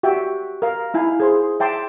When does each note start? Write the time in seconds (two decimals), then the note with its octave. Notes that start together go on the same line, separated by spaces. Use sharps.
0.03 F#4 G4 E5 G5
0.62 A#4 F5
0.94 D#4 E4 F5 G#5
1.20 G#4 C5 C6
1.60 E5 G5 A5 C6 D6